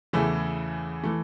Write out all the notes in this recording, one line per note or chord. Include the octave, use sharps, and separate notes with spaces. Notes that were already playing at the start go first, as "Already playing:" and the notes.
E2 C#3 E3 A3 E4
E3 A3